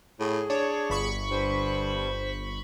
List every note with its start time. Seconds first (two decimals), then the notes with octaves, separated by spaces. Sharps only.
0.20 A2 G#4
0.50 D4 C#5
0.90 G1 B5 C#6
1.30 G2 C5